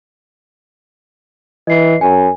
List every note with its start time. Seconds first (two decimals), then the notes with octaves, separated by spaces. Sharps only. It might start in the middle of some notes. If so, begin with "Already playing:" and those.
1.67 E3 D#5 C7
2.01 F#2 G#5